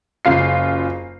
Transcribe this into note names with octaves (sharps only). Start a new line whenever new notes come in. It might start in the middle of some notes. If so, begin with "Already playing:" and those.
F#1 C#3 F4 C7